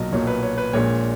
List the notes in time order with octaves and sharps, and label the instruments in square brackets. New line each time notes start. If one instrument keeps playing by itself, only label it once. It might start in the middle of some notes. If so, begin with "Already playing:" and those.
Already playing: [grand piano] B1 A#2 F#3 D#5
B1 A#2 F#3 C#5
B4
C#5
B4
A#1 A#2 G#3 C#5